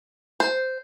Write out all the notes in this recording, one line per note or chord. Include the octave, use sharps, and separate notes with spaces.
C5